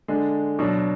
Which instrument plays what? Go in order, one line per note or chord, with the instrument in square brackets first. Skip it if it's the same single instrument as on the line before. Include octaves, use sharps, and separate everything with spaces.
[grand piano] D3 G#3 D4
B2 F#3 D4